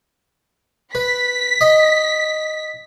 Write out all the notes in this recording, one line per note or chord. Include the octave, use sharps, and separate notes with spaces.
B4 B6
D#5